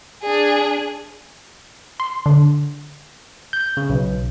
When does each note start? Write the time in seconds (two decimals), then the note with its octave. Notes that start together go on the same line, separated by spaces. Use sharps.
0.23 D4 G#4
2.00 C6
2.26 D3
3.53 G6
3.77 C#3
3.90 B1